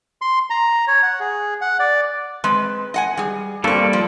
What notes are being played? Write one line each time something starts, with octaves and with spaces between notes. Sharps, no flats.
C6
A#5
C#5
F#5
G#4
F#5
D5
G#3 C4 B4
D#5 F#5 G#5
G3 G#4
G2 G3 A#3 C4 A4
F3